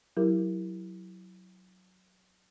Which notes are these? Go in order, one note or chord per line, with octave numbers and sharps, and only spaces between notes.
F#3 E4 G4 A#4